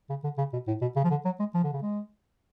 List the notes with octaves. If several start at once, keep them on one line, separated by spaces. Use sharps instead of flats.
C#3
D3
C#3
B2
A2
B2
C#3
F3
D3
F#3
G#3
F3
D3
C#3
G#3